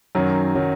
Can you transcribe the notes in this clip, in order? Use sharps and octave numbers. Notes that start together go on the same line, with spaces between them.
F#2 D#3 F#3
D#3 F#3